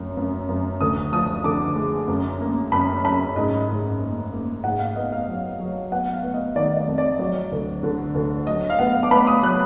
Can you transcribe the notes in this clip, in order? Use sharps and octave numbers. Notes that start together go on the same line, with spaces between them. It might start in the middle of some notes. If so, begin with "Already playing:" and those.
Already playing: F#2 F3
F#2
F#2
D2 D#6
F3 D#6
D3 D6
G#3
F#2
A#3
F#2 B5
F#2 B5
G#2 D#5
G#2
A#3
A#3
G#2 F#5
F5
B3 D#5
F5
F#3
F#3
B3 F#5
F5
B3
D#5
D#3 D5
D5
F2
D5
F#3 D5
D2
D3
D2
F#3 D#5
F5
B3 F#5
D6
B3 B5
D#6
F#3 F#6